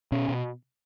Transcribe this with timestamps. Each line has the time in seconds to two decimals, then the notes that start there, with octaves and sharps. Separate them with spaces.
0.12 B2 C#4
0.28 B2